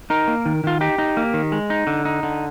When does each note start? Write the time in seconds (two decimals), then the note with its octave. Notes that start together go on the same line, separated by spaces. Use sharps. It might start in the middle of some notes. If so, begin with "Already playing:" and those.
0.10 D#4 A#4
0.28 A#3
0.46 D#3
0.64 D#3 F4
0.81 D#4 G4
0.98 D#4
1.17 A#3
1.34 D#3
1.52 G#3
1.70 D#4
1.87 D3
2.05 D#4
2.23 D3